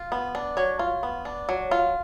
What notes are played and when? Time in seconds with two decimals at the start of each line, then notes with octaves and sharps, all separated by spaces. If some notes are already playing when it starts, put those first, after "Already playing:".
Already playing: F4
0.12 B3
0.35 D4
0.57 F#3 C#5
0.79 F4
1.03 B3
1.25 D4
1.49 F#3
1.71 F4